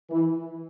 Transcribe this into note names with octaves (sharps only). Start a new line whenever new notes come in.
E3